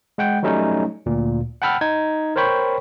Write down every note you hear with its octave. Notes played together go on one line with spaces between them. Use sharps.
G#3 F#5 G5
F#3 G3 A3 C#4 D#4
D2 A#2
F#5 G5 A5 B5 E6 F6
D#4 G#6
A#4 C5 C#5 G5 B5 C#6